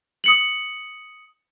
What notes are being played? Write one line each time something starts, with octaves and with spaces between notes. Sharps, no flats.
D#6 C#7 F#7